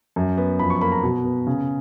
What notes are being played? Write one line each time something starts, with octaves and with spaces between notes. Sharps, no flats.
F#2
B3
F2 B5
C#6
A#3 B5
A#5
B2
B3
C#3